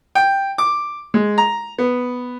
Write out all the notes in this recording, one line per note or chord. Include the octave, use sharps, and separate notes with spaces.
G5
D6
G#3
A#5
B3